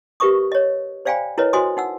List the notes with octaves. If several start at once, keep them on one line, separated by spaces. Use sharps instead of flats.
G4 A#4 B4 E5 C#6 D#6
C#5 D#5
C5 D5 F5 G5 G#5 B5
E4 A#4 B4 C#5 D#5
F#4 C5 D#5 G#5 C6 D#6
D#4 F#5 E6